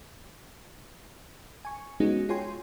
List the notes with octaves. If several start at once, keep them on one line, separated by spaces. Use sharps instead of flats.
G#5 C#6
G#3 B3 C#4 D#4 F#4 G#4
F4 G#4 C#5 G5 G#5 C6